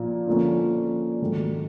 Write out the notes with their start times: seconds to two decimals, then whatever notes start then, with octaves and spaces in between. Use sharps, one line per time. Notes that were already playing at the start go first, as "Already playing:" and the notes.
Already playing: A#2 F3 A#3
0.27 D3 F3 A#3 C#4
1.21 G#2 D#3 F#3 A3 D4